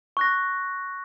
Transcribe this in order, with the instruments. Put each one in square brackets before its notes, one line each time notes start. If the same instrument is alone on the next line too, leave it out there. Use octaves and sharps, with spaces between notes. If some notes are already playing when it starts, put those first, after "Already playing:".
[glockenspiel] C#6 F#6 A#6